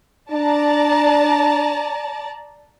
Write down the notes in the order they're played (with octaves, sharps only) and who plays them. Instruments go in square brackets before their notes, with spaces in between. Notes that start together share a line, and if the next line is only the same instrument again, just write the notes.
[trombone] D4 [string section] D5 A5 A#5